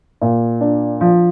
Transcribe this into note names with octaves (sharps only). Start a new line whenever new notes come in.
A#2
D4
F3